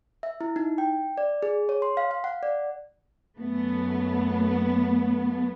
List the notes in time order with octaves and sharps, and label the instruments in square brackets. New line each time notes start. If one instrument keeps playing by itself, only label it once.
[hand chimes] E5
E4
D#4
G5
D5
G#4
C#5
C6
F5
F5
F#5
D5
[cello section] F#2 A3 B3